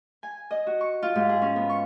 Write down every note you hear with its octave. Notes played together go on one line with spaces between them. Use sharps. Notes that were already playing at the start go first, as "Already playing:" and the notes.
G#5
D#5
F#4
C#6
F4
G#2
G#4
C#4
B3
C#6